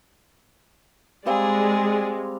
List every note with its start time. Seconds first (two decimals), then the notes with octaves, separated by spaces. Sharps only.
1.26 G3 G#3 C4 G#4 D5 F5